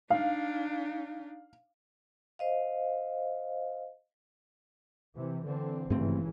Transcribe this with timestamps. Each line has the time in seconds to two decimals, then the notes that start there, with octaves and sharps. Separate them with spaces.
0.10 D4 D#4 F5
2.39 C5 D#5 F5
5.15 C3 E3
5.44 D3 E3 C4
5.90 G#1 G2 C#3 E3 A3 C4